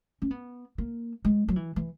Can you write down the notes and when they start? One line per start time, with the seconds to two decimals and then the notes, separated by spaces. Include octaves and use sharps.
0.22 C#4
0.31 B3
0.78 A#3
1.25 G#3
1.48 F#3
1.56 E3
1.76 E3